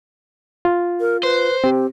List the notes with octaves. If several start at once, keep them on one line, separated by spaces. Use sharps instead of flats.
F4
A#4
B4 C5
C4 G4